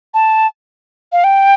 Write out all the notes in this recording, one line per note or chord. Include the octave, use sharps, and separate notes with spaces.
A5
F5
G5